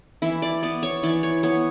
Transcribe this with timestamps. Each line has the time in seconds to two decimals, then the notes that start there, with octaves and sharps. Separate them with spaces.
0.22 E3 E4
0.42 D5
0.63 B3 D5
0.83 C#5
1.03 E3 D5
1.23 C#5
1.43 B3 C#5